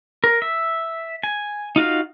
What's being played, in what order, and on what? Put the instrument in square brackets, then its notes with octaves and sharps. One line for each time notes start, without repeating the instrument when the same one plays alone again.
[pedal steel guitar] A#4
E5
G#5
D#4 F4 F#4 F5